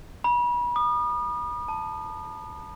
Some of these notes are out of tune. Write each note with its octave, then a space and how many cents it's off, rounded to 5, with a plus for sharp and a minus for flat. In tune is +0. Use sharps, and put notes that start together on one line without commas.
B5 -35
D#6 -35
A5 +5